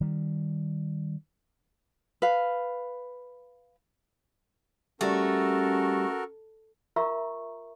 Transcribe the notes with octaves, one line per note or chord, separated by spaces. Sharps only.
D#3 G3
B4 F5
G3 A3 C#4 F#4 A4 A#4
F4 A#4 E5 A#5 C#6